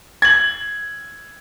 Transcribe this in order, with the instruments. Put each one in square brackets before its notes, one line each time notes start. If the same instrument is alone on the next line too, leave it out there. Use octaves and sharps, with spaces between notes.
[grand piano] G#6 F#7